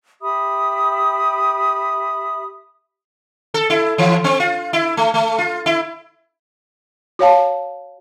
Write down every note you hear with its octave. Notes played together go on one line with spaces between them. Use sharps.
G4 E5 B5 D#6
A4
E4
E3
C4
F4
E4
A3
A3
F4
E4
F#4 C#5 F5 A5